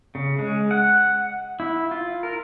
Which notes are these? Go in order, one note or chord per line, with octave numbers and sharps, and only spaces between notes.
C#3
G#3
F#5
E4
F4
A#4